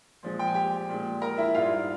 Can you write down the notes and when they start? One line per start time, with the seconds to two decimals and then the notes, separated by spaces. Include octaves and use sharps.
0.23 A#2 F3 G#3
0.39 G5
0.47 G#5
0.54 G4 G5
0.89 A#2 G#3
1.22 A#4 A#5
1.38 E4 E5
1.54 G#2 G3 F4 F5